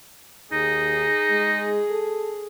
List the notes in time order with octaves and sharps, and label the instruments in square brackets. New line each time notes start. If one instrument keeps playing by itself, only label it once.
[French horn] D#2 [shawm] D#4 [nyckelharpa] G#4
[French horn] G#3
A4